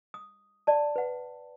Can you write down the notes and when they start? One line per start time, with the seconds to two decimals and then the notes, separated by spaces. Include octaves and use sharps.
0.14 D#6
0.67 D5 A5
0.96 B4 F#5